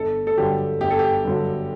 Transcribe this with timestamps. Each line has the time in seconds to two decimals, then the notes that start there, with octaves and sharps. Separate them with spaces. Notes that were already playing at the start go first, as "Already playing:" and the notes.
Already playing: G1 A4
0.27 A4
0.37 G2 D3 F#3 G4
0.80 G1 G4
0.90 A4
0.99 G4
1.24 G2 D3 F#3